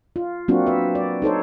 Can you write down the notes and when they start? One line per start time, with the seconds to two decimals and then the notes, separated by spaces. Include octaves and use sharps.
0.16 F4
0.48 F#3 A#3 C4 D4 F4 F#4
0.67 B4 E5
0.95 D5
1.22 D#4 A4 C5 C#5